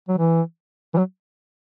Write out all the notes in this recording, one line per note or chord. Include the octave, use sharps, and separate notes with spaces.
F#3
E3
E3
F#3